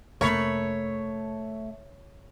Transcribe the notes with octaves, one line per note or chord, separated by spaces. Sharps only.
F2 C3 A3 A#3 A#4 C#5 B5